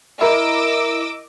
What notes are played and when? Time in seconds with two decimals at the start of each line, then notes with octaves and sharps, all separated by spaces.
0.21 E4 A#4 D#5 D6 E6